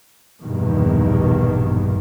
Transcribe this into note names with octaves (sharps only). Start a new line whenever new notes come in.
A#1 E2 G2 B2 D#3